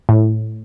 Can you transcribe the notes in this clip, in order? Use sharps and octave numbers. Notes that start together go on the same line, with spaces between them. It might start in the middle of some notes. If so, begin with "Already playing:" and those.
A2